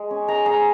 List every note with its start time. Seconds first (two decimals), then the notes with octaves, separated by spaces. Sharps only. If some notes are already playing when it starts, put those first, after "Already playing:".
Already playing: G#3
0.11 C#4
0.28 G#3 A#5
0.46 G#3 A#5